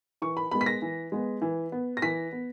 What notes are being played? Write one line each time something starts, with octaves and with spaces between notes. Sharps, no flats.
E3 C#6
B5
G#3 B3 B5
B6
A#6
E3
G#3 B3
E3
B3
A#6
E3 B6
B3